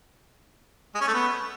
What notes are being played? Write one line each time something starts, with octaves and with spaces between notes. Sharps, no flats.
G#3
C#4
A3
B3